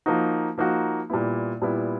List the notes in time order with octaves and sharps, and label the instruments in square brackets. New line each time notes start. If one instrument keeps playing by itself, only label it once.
[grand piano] F3 A#3 D#4 F#4
F3 A#3 D#4 F#4
A#2 G3 B3 E4
A#2 G3 B3 E4